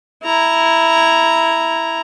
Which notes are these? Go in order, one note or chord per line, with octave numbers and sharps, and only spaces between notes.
E4 A#5